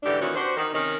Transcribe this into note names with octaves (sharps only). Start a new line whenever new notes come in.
G#2 D3 E3 D4 G4
A#2 D#3 E3 C#4 F#4
D4 F#4 G4 C5
D#3
C3 D#3 C#4 A#4